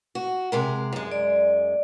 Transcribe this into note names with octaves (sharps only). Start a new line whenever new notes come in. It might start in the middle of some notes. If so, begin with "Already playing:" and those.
F#4
C3 G#3 A#4
F#2 G#3
D5